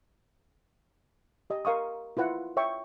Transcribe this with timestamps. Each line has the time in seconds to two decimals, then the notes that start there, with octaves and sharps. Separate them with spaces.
1.50 G4 D#5
1.65 A#4 F5 C#6 D#6
2.17 E4 F4 B4 F#5
2.57 C#5 E5 G5 C#6